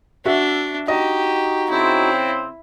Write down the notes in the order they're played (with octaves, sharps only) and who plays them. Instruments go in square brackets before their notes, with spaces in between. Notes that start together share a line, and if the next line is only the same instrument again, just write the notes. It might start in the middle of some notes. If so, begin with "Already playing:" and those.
[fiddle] D4 [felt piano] F#4 E5
[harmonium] D#4 F#4 [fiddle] G4 [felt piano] D#5
[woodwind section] C#3 C4 [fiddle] E4